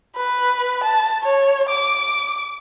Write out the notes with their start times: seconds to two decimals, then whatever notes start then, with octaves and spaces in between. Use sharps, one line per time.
0.17 B4
0.84 A5
1.23 C#5
1.69 D6